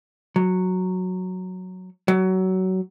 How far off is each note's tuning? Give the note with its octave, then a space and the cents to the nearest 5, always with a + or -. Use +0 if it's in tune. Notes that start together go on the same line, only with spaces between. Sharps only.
F#3 -5
F#3 +20